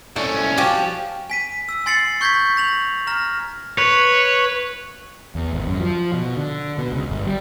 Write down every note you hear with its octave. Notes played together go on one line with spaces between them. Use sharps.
C2 A3 C#4
F3 F#4 G4
G#5 B6 D#7
E6
G#5 C6 A6 C7 C#7 F#7
C#6 G6 G#6 A#6 B6
A#6 F7 F#7
A#5 F6 A#6
B4 C#5
E2
G#1
F#2
F3
B2
D3
B2
C#2
G1
G3